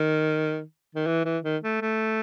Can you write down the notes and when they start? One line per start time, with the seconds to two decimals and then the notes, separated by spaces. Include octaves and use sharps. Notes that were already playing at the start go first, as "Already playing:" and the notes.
Already playing: D#3
0.95 D#3
1.07 E3
1.25 E3
1.44 D#3
1.63 A3
1.81 A3